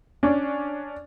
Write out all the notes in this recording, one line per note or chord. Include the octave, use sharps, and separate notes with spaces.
C#4 D4